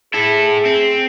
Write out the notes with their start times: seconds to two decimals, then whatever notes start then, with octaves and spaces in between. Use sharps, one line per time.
0.14 E4 G#4 A4
0.65 C4